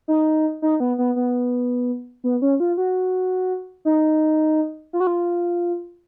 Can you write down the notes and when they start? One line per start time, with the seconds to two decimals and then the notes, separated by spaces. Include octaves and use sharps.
0.08 D#4
0.62 D#4
0.80 B3
0.98 B3
1.16 B3
2.24 B3
2.42 C#4
2.60 F4
2.77 F#4
3.85 D#4
4.93 F4
5.00 F#4
5.07 F4